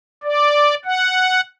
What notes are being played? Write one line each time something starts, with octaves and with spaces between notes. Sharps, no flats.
D5
F#5